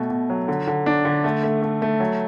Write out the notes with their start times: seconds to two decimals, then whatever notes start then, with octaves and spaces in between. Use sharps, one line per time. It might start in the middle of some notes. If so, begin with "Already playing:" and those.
Already playing: B2 A3
0.10 B2
0.30 F#3
0.48 D3
0.67 D3
0.86 D4
1.05 D3
1.24 A3
1.43 A3
1.62 A3
1.82 A3
2.00 F#3